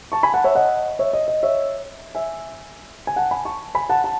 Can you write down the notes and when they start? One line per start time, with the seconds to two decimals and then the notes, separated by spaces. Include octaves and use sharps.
0.12 A5 C#6
0.23 G#5 B5
0.34 F#5 A5
0.44 C#5 E5
0.55 D#5 F#5
0.99 C#5 E5
1.13 D#5
1.28 D#5
1.43 C#5 E5
2.15 E5 G#5
3.07 G#5
3.16 F#5 A5
3.31 G#5 B5
3.45 A5 C#6
3.75 G#5 B5
3.89 F#5 A5
4.04 F#5 A5